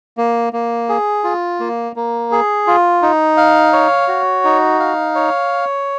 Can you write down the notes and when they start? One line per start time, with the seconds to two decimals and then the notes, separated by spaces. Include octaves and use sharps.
0.17 A#3
0.53 A#3
0.89 G#4
1.24 F4
1.60 A#3
1.96 A#3
2.32 G#4
2.67 F4
3.02 D#4
3.37 F5
3.73 C#5
4.08 F#4
4.44 D#4
4.80 F5
5.15 C#5